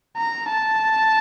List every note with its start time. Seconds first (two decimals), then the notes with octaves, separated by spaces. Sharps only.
0.17 A#5
0.50 A5